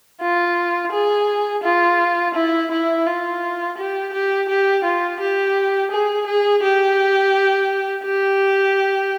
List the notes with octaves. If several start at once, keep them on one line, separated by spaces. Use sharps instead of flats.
F4
G#4
F4
E4
E4
F4
G4
G4
G4
F4
G4
G#4
G#4
G4
G4